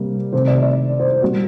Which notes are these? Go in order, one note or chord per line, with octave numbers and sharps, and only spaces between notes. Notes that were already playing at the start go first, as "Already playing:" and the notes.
Already playing: C3 G3 A#3
C3 D#3 A3 C5
D5
D5
C5
A#2 G3 A#3 F#4